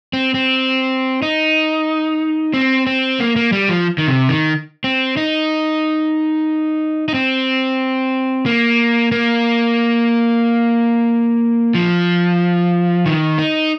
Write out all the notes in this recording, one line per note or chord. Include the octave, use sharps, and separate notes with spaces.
C4
C4
D#4
C4
C4
A#3
A#3
G3
F3
D#3
C3
D#3
C4
D#4
D#4
C4
A#3
A#3
F3
D#3
D#4